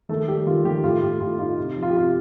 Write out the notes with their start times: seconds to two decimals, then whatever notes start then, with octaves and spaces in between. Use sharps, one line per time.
0.09 D#3 A3 A4
0.28 G3 G4
0.46 D#3 F4
0.65 D#3 G4
0.84 A2 F4
1.02 A2 G4
1.20 A2 F4
1.39 D#4 F4
1.57 C3
1.76 F3
1.83 F4
1.90 G4
1.95 C3 F4